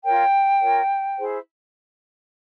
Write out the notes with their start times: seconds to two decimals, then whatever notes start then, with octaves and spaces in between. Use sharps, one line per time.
0.04 F4 A#4 C#5 G5
0.61 F4 A#4 C#5
1.18 E4 G#4 C5